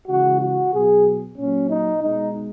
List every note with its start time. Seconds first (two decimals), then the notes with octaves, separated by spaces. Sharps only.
0.08 C#3 E3 G#3 F#4
0.41 F#4
0.74 B2 F#3 G#4
1.38 A#2 F#3 C#4
1.70 D#4
2.03 B2 G#3 D#4